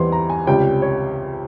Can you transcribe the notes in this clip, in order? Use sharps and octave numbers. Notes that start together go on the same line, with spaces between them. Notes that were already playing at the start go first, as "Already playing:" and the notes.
Already playing: E2 E3 G3 C4 C6
A#5
G#5
C#2 C3 G3 C#4 G5
C#5